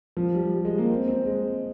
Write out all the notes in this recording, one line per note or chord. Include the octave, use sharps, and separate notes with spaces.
F3
G3
G3
G#3
A#3
C4
C4
G#3